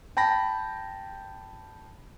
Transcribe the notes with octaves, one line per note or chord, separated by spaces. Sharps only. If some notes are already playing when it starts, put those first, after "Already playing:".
G5 A5 B5 A#6